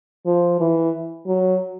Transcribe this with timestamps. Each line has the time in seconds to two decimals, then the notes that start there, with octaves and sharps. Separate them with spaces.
0.26 F3
0.60 E3
1.27 F#3